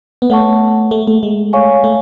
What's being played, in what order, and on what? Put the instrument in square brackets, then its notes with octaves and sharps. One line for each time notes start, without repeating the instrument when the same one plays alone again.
[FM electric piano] B3
[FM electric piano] A3 [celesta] C#5 F#5 A5 C#6
[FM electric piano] A3
A3
G#3
[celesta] C#5 F5 G#5 C#6
[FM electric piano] A3